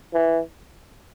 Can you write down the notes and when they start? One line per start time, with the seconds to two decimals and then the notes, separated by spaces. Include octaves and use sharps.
0.14 E3